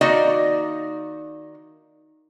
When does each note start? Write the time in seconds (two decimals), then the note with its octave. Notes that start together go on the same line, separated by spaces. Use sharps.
0.01 D#3 A#3 D#4 F#4 D5 D#5